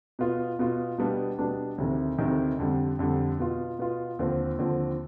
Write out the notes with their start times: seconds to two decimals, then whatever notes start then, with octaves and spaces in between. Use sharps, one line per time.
0.19 B2 B3 F4
0.59 B2 B3 F4
0.98 B2 G3 B3 D4
1.39 B2 G3 B3 D4
1.78 D2 C3 D#3
2.19 D2 C3 D#3
2.59 F2 D3 G3
2.99 F2 D3 G3
3.39 B2 B3 F4
3.79 B2 B3 F4
4.19 D#2 D3 F3 C4
4.58 D#2 D3 F3 C4